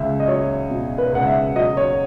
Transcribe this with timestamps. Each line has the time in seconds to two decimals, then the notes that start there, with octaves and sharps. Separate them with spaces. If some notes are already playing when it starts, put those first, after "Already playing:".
Already playing: C#2 E5
0.20 D#5
0.27 F#3 C#5
0.70 B2
0.98 B4
1.12 C#2 F#5
1.27 E5
1.56 F#3 D#5
1.77 C#5